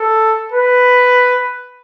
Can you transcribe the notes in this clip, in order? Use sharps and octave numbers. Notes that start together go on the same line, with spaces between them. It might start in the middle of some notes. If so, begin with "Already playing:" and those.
Already playing: A4
B4